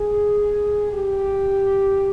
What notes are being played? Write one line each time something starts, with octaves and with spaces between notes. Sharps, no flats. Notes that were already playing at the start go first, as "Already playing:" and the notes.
Already playing: G#4
G4